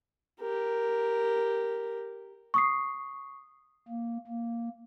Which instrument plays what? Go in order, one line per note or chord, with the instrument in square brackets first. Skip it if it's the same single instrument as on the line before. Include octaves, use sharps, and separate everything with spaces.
[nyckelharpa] G4 A#4
[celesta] C#6 D#6 C7
[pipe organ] A#3
A#3